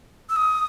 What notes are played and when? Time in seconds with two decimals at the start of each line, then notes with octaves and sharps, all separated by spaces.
0.29 E6
0.36 D#6